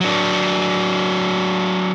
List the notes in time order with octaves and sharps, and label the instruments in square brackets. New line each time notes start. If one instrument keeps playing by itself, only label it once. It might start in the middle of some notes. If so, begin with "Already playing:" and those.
[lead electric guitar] F#3 D4